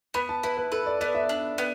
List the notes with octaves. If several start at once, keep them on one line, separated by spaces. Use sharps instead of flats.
B3 B5
A5
E4 B4
B4
A4 B4
D5
B3 D5
E5
D4
B3